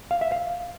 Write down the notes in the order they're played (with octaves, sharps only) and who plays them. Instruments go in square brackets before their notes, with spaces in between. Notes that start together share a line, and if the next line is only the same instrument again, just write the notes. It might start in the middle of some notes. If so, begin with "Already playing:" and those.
[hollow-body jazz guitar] F5
E5
F5